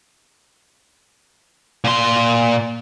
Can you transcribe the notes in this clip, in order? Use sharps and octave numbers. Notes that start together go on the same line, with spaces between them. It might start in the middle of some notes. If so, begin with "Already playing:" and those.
A#2 C6